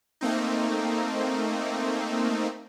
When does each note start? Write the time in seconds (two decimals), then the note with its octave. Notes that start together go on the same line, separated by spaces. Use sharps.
0.21 A3 A#3 C4 D#4